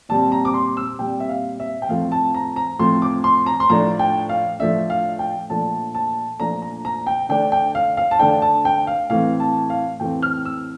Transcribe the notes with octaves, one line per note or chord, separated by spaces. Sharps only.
A#2 G3 C4 A5
A#5
D6
C6
E6
A#2 G3 C4 G5
E5
F5
E5
G5
A2 F3 A3 C4 F5
A5
A#5
A#5
A2 F3 A3 C4 C6
D6
C6
A#5
C6
A2 F3 A3 D4 A#5
G5
F5
A2 F3 A3 D4 E5
F5
G5
A#2 F3 A3 D4 A5
A5
A#2 F3 A3 D4 A#5
A#5
A#5
G5
D3 A3 D4 G5
G5
F5
F5
A5
D3 A3 D4 G5
A5
G5
F5
A2 E3 A3 C4 F5
A5
F5
A2 E3 A3 C4 G5
F6
E6